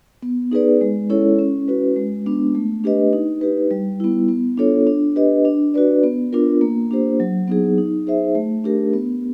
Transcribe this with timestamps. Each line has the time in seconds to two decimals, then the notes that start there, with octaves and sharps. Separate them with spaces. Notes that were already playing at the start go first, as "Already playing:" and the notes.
0.22 B3
0.52 D#4 G#4 B4 D5
0.81 G#3
1.10 C#4 E4 A4 C#5
1.39 C#4
1.68 F#4 B4
1.96 G#3
2.26 B3 D4
2.55 A3
2.84 D4 G4 B4 D#5
3.13 D#4
3.41 G4 B4
3.71 G3
4.00 B3 E4
4.28 B3
4.57 D4 F4 A4 C#5
4.87 D4
5.16 G4 B4 D#5
5.45 D4
5.74 F#4 B4 D5
6.03 B3
6.33 D4 F4 A#4
6.61 A#3
6.91 D4 G4 C5
7.20 F#3
7.48 B3 D#4 G#4
7.78 D#4
8.07 G#4 C5 E5
8.35 A3
8.64 D4 G4 A#4
8.93 B3